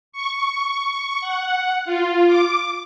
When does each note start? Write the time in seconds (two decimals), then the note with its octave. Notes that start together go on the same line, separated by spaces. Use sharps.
0.12 C#6
1.21 F#5
1.85 F4
2.27 D6